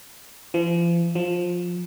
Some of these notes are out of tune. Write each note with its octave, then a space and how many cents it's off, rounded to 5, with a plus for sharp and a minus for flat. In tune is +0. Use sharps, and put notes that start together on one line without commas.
F3 -40
F3 +15